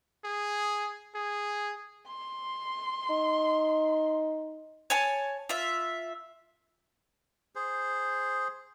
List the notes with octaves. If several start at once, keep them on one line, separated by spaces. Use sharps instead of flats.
G#4
G#4
C6
D#4
C#5 G#5 A5
F4 E5
G#4 C5